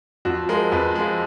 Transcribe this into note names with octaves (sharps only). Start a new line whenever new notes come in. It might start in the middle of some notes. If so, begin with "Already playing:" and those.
F2 F#4
F3 G#3 A#4
F2 B4
F3 G#3